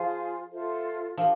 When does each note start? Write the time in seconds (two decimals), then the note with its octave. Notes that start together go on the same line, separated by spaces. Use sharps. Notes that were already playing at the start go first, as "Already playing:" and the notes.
Already playing: F3 F4 G#4 C5 F5
0.51 F4 A4 C5 E5
1.17 F3 D4 G4 A#4